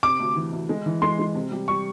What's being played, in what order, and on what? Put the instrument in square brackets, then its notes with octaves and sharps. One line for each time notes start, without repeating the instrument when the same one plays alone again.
[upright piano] C3 [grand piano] D6
[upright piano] D2
E3
D2
G#3
E3
[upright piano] G#3 [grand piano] C6
[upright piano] G#3
C3
G3
[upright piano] G3 [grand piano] C#6